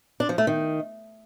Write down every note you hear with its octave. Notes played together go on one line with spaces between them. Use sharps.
D4
F3
A3
D#3